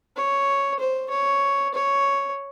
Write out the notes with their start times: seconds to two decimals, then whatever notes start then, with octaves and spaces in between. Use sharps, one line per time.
0.16 C#5
0.79 C5
1.10 C#5
1.74 C#5